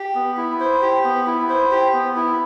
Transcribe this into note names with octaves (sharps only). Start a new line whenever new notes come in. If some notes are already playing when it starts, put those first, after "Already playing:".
Already playing: G4
B3
E4
C5
G4
B3
E4
C5
G4
B3
E4